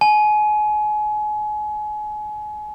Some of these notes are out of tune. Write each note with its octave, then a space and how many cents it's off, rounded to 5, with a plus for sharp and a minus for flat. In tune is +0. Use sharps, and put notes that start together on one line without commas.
G#5 +30